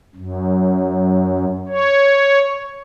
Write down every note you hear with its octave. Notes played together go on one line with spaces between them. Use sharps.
F#2
C#5